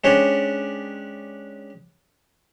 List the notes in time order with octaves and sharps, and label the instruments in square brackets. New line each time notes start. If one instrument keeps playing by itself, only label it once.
[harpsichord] G#3 C#4 D4 G4 C5 C#5